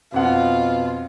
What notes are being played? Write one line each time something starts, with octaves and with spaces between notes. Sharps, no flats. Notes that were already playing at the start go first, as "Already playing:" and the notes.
F2 B2 F4 F#5